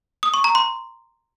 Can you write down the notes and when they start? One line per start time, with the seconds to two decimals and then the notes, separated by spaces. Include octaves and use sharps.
0.23 D#6
0.34 C#6
0.44 A#5
0.55 C6